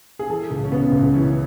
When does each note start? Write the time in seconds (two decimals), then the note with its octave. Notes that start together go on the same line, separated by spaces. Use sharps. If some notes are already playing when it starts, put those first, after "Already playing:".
0.19 G#4
0.30 E3 A4
0.51 C#2
0.64 C#4
0.72 C#3 B3
0.92 C#2
1.14 E3 C#4